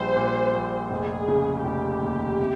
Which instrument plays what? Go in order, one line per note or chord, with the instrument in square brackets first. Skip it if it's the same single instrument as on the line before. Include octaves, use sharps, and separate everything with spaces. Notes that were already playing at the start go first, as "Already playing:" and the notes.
Already playing: [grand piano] A#1 G3 [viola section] C5
[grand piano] A#2
A#1
[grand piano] F1 [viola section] G#4
[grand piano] C#3
[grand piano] F1 [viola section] G4
[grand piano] D#2
C3